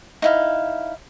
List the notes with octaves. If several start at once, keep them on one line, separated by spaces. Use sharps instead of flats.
D#4 E4 F5